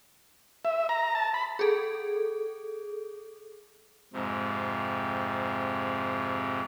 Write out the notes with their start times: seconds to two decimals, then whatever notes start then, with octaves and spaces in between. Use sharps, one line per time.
0.65 E5
0.89 A#5
1.15 A5
1.34 B5
1.59 G#4 A4
4.13 F2 G#2 C3